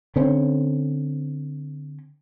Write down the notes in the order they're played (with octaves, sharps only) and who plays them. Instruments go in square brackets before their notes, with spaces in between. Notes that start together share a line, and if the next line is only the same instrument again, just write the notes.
[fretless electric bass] D3 C4 C#4